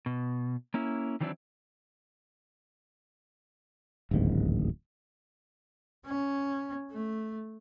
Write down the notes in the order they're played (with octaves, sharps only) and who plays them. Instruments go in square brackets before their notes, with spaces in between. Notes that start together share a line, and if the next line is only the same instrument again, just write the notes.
[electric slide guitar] B2
A#3 C#4 E4
D#3 E3 F#3 C4 D4 E4
[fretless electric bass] D1 A1 D#2 G#2
[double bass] C#4
A3